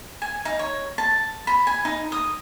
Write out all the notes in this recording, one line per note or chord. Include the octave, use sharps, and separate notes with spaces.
G#5
D#4
C#5
A5
B5
G#5
D#4
D#6